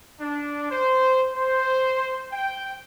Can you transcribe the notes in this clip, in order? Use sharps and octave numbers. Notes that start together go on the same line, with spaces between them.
D4
C5
C5
G5